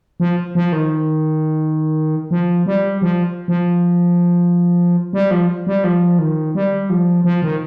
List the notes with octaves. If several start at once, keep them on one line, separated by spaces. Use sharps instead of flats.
F3
F3
D#3
F3
G3
F3
F3
G3
F3
G3
F3
D#3
G3
F3
F3
D#3